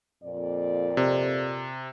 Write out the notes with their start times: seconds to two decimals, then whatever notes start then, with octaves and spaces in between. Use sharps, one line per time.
0.24 F2 A#2 D5
0.97 C3